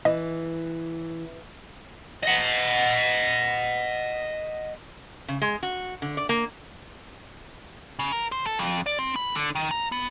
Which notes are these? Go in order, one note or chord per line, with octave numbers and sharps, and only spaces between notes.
E3 D#5
D#5 F#5
C#3
G#3
F#4
D3
D5
A#3
C#3
A#4
C5
A4
F2
D5
C4
B5
D3
D#3
A#5
B3